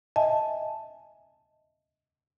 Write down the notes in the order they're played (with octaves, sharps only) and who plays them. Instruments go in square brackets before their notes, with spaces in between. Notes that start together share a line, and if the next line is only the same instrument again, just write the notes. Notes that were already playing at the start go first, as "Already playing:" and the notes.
[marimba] D#5 E5 G#5 A5